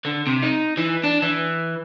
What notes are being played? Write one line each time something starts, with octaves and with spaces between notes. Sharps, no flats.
D3
C3
D#4
E3
D4
E3